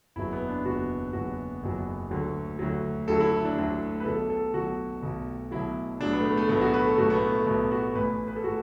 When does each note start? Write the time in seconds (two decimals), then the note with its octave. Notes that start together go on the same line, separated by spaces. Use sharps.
0.16 F#1 E2 B2 F#3 E4
0.32 B3
0.48 D4
0.65 F#1 E2 B2 F#3 F#4
1.13 F#1 E2 B2 F#3 F#4
1.62 F#1 E2 B2 F#3
2.11 D2 D3 F#3
2.59 D2 D3 F#3
3.08 D2 D3 F#3 A4
3.20 E4
3.33 E4
3.45 D4
3.57 D2 D3 F#3
4.00 B4
4.05 B1 B2 F#3 A4
4.30 A4
4.54 B1 B2 F#3 F#4
5.03 B1 B2 F#3
5.51 B1 B2 F#3 E4
6.00 B1 A2 F#3 D4
6.13 B3
6.20 A3
6.25 B3
6.37 A3
6.49 B1 A2 F#3 B3
6.61 F#4
6.74 B4
6.86 A4
6.98 B1 A2 F#3 F#4
7.10 B3
7.14 A3
7.31 A3
7.46 B1 A2 F#3 B3
7.71 F#4
7.95 A1 A2 E3 B4
8.28 B4
8.36 A4
8.44 A2 F#4